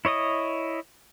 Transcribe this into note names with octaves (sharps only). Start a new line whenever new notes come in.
E4 C#5 D#5 D#6